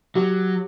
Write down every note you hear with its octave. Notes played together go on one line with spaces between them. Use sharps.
F#3 G4